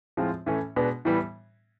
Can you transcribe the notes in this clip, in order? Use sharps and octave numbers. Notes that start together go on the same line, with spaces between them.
A2 F3 G#3 C4 F4
A2 E3 A3 C#4
B2 G#3 B3 D4
A2 E3 G3 B3